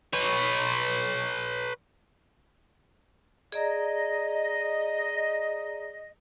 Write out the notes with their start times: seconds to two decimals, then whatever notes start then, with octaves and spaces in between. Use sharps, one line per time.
0.13 B4 C#5
3.52 G#4 D5 D#5 A#5